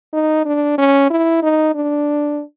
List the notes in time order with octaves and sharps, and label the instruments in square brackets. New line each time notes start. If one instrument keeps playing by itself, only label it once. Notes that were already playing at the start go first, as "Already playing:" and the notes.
[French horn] D#4
D4
C#4
E4
D#4
D4